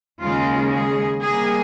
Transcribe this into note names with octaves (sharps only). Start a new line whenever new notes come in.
D#2 C#3 G#3 F4
G#4
C3 G3 A#3 G#4